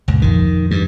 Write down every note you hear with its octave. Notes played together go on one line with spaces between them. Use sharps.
G1 C#2 A#2
F2 D#3 F3
G2